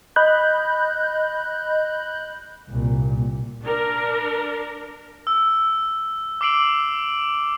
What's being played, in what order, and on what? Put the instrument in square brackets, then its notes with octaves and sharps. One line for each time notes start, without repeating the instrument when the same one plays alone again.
[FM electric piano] D#5 B5 F#6 G6
[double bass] C2 A#2
[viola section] D4 A#4
[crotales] E6
D6 E6 C7 D7 F#7